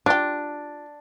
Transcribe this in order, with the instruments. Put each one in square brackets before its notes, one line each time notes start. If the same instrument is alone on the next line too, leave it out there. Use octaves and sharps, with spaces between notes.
[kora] D4 [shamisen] F4 G4